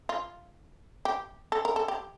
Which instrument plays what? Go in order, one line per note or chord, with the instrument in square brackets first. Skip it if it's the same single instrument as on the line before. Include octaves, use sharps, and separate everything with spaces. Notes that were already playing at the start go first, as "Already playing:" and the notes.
[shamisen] F4
G4
A4
A#4
A4
G4